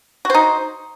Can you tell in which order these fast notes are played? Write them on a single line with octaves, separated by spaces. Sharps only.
F#4 C5 D#4